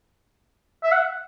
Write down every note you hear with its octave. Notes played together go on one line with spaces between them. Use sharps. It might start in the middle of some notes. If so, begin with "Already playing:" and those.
E5
F#5